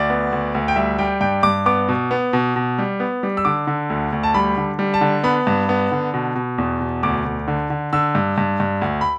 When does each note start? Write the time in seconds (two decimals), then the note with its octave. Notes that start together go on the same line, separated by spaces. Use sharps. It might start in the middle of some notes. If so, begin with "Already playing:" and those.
Already playing: D2 D5
0.10 B3
0.32 D2
0.55 D2
0.68 G5
0.76 G3 E5
0.98 G3 G5
1.21 G2 G5
1.43 G2 D6
1.66 B3 D6
1.89 B2
2.11 B3
2.33 B2
2.56 B2
2.78 G3
3.00 B3
3.23 G3
3.37 E6
3.45 D3 D6
3.67 D3
3.90 D2
4.13 D2
4.23 A5
4.34 G3 B5
4.57 D3
4.79 G3
4.94 A5
5.01 D3
5.24 B3 B5
5.47 G2
5.69 B3
5.91 D3
6.14 B2
6.35 B2
6.58 E2
6.80 B2
7.03 D2 D6
7.25 D2
7.48 D3
7.70 D3
7.93 D3 E6
8.15 G2
8.38 G2
8.60 G2
8.82 D2
9.01 B5